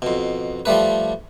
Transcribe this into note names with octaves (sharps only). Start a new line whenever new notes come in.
F2 B2
F3 G3 A3 B4